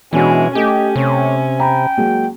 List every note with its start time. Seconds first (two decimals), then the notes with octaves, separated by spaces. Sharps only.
0.13 B2 E3 G#3 C#4 D4 F#4
0.55 A3 C#4 G4 D#5
0.96 C3 C#5
1.60 G5 A#5 B5
1.97 F#3 G#3 A#3